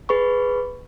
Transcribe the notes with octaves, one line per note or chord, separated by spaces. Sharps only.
G#4 B4 B5 C#6